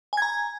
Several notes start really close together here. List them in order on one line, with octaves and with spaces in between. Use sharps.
G#5 G#6 A#5